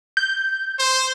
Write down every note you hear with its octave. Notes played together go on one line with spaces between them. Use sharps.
G6
C5